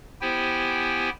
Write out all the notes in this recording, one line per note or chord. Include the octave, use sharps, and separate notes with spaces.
B3 E4 G4 C5 G5 G#5